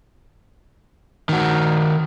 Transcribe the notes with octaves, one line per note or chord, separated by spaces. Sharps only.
D#3 F#4